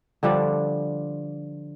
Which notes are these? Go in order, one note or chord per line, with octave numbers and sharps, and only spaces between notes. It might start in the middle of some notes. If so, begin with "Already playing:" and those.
D3 F3 G3 D4